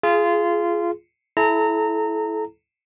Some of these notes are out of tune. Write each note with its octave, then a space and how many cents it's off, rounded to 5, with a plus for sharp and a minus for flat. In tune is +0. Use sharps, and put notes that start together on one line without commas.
F4 -20 G#4 +10
E4 +0 A4 -35 A#5 -25